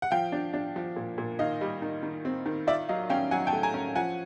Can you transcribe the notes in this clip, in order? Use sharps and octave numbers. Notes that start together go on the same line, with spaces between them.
F#5
F3 F5 G5
D4
D4
F3
A#2
A#2
D#3 D#5 F5
G3
D#3
D#3
C4
D#3
F4 D5 E5
F#3 D#5 F5
C#4 F5 G5
F#3 F#5 G#5
G5 A5
A3
G#5 A#5
C#4
F3 F#5 G#5